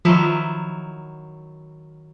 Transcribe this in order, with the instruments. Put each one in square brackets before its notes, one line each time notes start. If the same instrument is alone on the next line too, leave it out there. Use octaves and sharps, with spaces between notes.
[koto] D#3 F#3 E4 [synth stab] F3